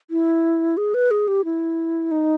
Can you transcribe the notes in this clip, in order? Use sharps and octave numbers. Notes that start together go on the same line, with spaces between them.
E4
G#4
B4
G#4
G4
E4
D#4